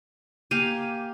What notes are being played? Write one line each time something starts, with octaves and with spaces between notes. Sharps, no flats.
A#3 G4 F5 G#5